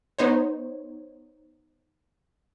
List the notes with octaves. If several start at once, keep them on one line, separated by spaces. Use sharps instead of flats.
B3 D#4 C5 C#5